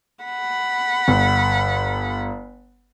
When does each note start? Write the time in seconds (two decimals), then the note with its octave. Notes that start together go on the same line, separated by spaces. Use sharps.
0.24 F#5 B5
1.08 G1